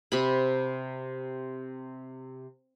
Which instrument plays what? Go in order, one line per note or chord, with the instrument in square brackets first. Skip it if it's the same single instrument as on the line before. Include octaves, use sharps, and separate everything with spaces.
[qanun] C3 B5